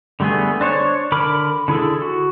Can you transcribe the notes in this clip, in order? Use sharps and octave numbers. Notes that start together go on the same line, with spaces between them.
D3 G3 A3 B3 G#4
D4 C5 C#5
D3 A#4 B5 D6
D3 E4 G#4 A4
F#4